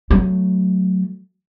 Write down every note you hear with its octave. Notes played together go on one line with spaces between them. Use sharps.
F#3 A3